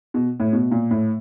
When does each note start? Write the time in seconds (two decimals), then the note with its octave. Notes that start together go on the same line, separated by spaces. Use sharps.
0.14 B2
0.40 A2
0.53 B2
0.71 A#2
0.91 A2